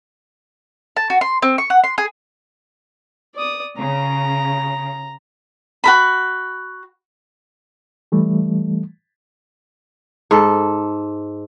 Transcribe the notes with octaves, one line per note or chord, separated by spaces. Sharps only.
A5
F#4
C6
C4
C#6
F#5
C6
G#4
D5 D#6
C#3 A#5
F#4 A#4 B5
E3 G3 A3
G#2 A4